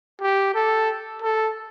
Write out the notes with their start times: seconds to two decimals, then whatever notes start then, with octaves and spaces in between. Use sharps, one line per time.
0.21 G4
0.54 A4
1.22 A4